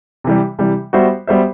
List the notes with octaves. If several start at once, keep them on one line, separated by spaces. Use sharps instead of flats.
C3 E3 G3
C3 E3 G3
G3 B3 F#4 C5 E5
G3 B3 F#4 C5 E5